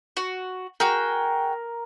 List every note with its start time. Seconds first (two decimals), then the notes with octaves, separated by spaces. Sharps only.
0.17 F#4
0.80 F#4 G#4 A#4 G5